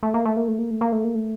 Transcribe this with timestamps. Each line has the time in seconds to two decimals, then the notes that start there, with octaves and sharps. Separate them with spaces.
0.03 A3
0.14 A#3
0.25 A3
0.37 A#3
0.48 A3
0.59 A#3
0.71 A3
0.81 A#3
0.92 A3
1.04 A#3
1.15 A3